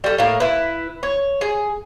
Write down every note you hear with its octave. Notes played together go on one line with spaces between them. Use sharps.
G3 A4
A2 A#3
E4 B4
C#5
G#4